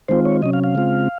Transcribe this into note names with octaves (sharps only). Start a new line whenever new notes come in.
D#3 G#3 C4 F4 C5
C#5
C3 F#3 C#4 D#5
F5
F5
C#3 G#3 C4 F4